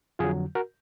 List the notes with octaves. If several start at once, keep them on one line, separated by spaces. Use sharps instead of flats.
F2 D3 F#3 F4 G#4
F#4 A#4